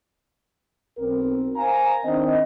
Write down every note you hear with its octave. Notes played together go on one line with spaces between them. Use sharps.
B1 C4 A#4
A#4 C5 F5 G#5 A#5
D#3 C4 D4 D#5